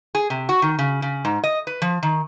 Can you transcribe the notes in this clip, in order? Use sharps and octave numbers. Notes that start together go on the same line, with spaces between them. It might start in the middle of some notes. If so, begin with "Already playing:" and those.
G#4
C3
F#4
D#3
C#3
C#3
G#2
D#5
B4
F3
D#3